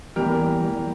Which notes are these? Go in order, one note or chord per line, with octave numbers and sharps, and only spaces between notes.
E2 E3 G3 A#3 G4 A#4
E2 E3 G3 A#3